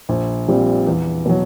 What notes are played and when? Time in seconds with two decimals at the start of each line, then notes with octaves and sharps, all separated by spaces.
0.09 A#1
0.48 A#2 G3 C4
0.87 E2
1.26 B2 F#3